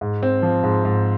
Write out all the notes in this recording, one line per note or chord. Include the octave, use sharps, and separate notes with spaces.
G#2
C4
F3
G#2
G#2